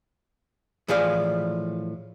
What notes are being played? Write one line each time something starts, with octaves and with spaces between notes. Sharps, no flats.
A2 E3 F3 G#4 D5 F5